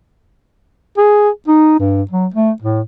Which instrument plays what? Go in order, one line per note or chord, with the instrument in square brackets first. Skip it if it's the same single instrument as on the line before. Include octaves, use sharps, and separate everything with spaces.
[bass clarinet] G#4
D#4
G2
F#3
A3
A2